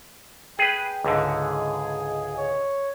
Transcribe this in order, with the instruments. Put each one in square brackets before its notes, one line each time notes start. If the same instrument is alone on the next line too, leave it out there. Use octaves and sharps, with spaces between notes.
[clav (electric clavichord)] G#4 B4 [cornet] G5
[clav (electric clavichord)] C#2 G#2 D3 [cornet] G#4
[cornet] C#5